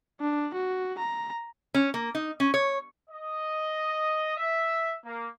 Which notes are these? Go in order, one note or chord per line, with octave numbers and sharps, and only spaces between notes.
D4
F#4
A#5
C#4
A#3
D#4
C#4
C#5
D#5
E5
A#3